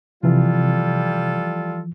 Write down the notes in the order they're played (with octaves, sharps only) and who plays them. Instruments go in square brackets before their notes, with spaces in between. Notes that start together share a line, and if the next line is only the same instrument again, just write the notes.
[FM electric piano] C3 [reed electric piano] E3 F3 [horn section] G3 F4 A4